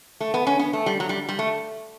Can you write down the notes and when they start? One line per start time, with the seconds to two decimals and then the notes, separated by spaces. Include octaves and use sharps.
0.20 A3
0.34 B3
0.47 C#4
0.59 B3
0.73 A3
0.86 G3
1.00 F#3
1.09 G3
1.29 G3
1.39 A3